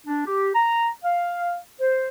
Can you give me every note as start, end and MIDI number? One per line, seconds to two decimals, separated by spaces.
0.07 0.22 62
0.26 0.50 67
0.55 0.88 82
1.04 1.57 77
1.80 2.09 72